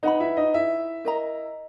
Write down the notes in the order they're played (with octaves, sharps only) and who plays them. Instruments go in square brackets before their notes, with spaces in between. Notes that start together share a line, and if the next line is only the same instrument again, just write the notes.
[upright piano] D#4 D#5 [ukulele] B4 F#5 B5
[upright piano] E4 E5
D#4 D#5
E4 E5
[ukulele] A#4 D#5 A#5